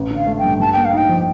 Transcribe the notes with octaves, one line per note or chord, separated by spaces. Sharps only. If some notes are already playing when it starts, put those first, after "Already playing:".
Already playing: A1
D3
F5
A3
G5
G2
G2 A5
A#3 G5
F5
D#4 G5
F3